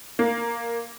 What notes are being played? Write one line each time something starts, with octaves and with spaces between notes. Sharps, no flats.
A#3